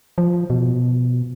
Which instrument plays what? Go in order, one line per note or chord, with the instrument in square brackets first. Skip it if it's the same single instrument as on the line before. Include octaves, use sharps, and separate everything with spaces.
[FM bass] F3
B2